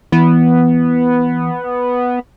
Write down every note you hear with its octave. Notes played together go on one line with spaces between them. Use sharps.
E3 B3